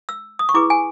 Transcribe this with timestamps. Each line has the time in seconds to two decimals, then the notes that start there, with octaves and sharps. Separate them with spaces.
0.09 E6
0.39 D#6
0.49 C#6
0.54 E4 G#4 B4 D6
0.70 G#5